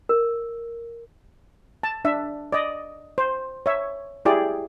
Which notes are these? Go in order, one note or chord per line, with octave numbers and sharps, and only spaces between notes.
A#4
A5
D4 E5
D5 D#5
C5
C#5 E5
E4 G4 G#4 D5